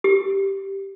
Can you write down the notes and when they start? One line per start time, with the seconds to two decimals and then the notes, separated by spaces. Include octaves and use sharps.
0.04 G4